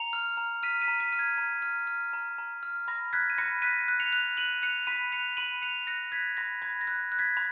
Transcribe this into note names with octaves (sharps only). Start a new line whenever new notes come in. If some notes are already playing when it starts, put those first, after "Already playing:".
Already playing: A#5 C#7 F7
F6
A#5
F6 B6 D#7
B6 D#7
A#5
B6 D#7
F6
G#6
A#5
F6
F6
A#5
A#5
F6
B5 A#6
F#6 G#6 B6
D#7
B5 A#6 C#7
F#6 B6 D#7
F#6
C#7 F7
F#6
F#6 D#7 F#7
F#6 C#7 F7
B5 B6 D#7
F#6 C#7 F7
B5 D#7 F#7
F#6 C#7 F7
F#6 A#6 C#7
F#6 G#6 B6
B5 A#6
B5 G#6
A#6
F#6
F#6
G#6 B6
B5